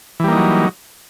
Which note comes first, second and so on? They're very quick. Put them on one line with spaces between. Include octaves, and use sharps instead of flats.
E3 G3 A#3 D#4 F#3